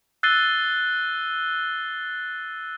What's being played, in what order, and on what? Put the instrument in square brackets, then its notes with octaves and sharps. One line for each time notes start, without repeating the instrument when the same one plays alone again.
[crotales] E6 F#6 A6 C7 D#7 G7